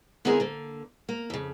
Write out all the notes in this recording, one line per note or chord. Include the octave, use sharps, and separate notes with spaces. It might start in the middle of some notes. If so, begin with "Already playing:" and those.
D3 B3 C4 E4 G#4 A#4
D3 A#3
A#3
F2 C#3